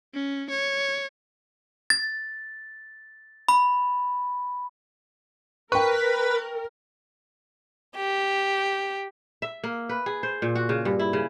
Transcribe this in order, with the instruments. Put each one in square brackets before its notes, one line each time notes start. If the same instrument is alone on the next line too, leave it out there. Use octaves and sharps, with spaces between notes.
[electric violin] C#4
C#5
[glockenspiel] A6
B5
[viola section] A#4 [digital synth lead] B4 [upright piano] G5 C#6
[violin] G4
[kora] E5
A#3
B4
G#4
C5
A#2
F#4
C#3
G2
E4
C#3